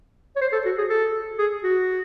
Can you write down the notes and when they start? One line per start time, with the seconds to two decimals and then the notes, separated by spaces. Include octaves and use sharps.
0.36 C#5
0.41 C5
0.52 A4
0.65 F#4
0.78 G#4
0.89 A4
1.38 G#4
1.63 F#4